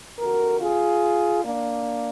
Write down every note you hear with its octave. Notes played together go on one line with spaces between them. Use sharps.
F2 D3 F#4 A#4
F4 G#4
A#3 D4